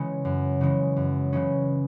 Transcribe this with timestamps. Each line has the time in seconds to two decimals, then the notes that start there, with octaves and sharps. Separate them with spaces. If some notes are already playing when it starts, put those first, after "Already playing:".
Already playing: C#3 E3 G#3 C#4
0.25 F#2
0.61 C#3 E3 G#3 C#4
0.96 F#2
1.33 C#3 E3 G#3 C#4